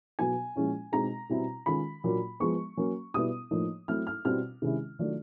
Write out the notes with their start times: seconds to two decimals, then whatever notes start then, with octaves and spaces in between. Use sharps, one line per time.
0.19 B2 F#3 B3 G#5
0.55 A#2 F3 G#3 C#4 E4
0.92 B2 G#3 C4 D#4 A#5
1.29 B2 G3 C4 E4
1.66 D#3 G#3 C#4 F4 B5
2.04 A#2 F#3 A#3 D4
2.40 F3 G#3 B3 C#6
2.77 F#3 A#3 C#4
3.14 B2 G3 B3 E4 D#6
3.51 A2 F3 A#3 D#4
3.88 F#3 A3 C4 E4 F6
4.07 F6
4.25 B2 G3 C4 E4 F6
4.62 C3 D#3 G#3 C#4 E4
4.99 D#3 F#3 A3 D4 F4